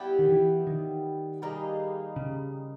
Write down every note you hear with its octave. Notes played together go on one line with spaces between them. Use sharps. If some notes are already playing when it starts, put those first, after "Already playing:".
Already playing: G3 B3 E4 G4
D#3
E3
D#3
G3 A#3 D#4 G#4
C#3